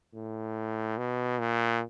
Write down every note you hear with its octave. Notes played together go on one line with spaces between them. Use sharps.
A2
B2
A#2